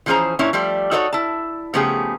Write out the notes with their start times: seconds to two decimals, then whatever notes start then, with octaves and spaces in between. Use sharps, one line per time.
0.06 E3 F3 C#4 G#4 C5 A#5
0.39 A#2 C#4 D4 E4 C#5
0.53 F3 G3 A3 D5
0.91 D#4 F#4 A4 B4 C#5 D5
1.13 E4 A5
1.74 C#3 F3 A3 B3 G4 G#4